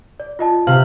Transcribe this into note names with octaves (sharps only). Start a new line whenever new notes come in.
D5
F4 D#5 A5
C3 G4 F5 F6 F#7